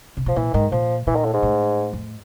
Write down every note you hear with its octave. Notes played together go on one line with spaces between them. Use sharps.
C3
B2 F3
A#2 E3
G#2 D#3
A#2 F3
A#2 E3
D#3
A2
G#2
A2
F2